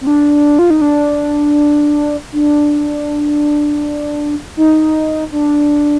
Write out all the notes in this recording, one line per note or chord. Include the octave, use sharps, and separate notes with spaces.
C4
D4
F4
D#4
D4
D4
D#4
D4